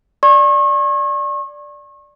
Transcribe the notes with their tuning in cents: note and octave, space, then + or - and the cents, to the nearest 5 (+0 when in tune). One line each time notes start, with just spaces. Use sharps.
D5 +0 C#6 -35